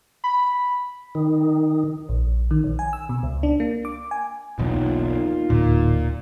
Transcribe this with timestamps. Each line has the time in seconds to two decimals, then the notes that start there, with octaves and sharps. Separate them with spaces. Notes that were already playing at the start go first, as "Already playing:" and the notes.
0.24 B5
1.15 D#3
2.09 A#1
2.51 D#3
2.64 A#1
2.79 G#5
2.93 E6
3.09 B2
3.23 C#2
3.43 D4
3.60 A#3
3.85 D6
4.11 G#5
4.59 E1 B1 E2 A#3 D#4 F4
5.50 D1 A#2